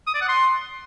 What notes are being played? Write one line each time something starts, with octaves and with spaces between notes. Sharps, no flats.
D#6
D5
F#5
C6